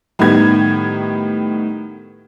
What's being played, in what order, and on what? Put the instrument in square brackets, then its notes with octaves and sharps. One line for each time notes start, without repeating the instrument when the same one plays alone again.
[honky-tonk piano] A2 D#3 G3 B3 G#6